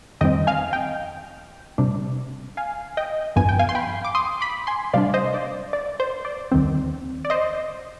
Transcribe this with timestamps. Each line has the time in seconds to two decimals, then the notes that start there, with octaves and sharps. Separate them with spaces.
0.21 F2 D#3 G3 C4 D#5 G5
0.47 F5 G#5
0.73 D#5 G5
1.78 C3 G3 D4
2.57 F5 G#5
2.97 D#5 G5
3.36 G2 F3 B3 G#5
3.49 G5
3.59 F5 G#5
3.69 C6
3.75 G5 B5
4.05 D6
4.15 C6 D#6
4.41 B5 D6
4.67 G#5 C6
4.93 C3 G3 D4 D5 F5
5.14 C5 D#5
5.34 D5
5.73 D5
6.00 C5
6.25 D5
6.52 D#2 D#3 G3 C4
7.25 D5
7.30 C5 D#5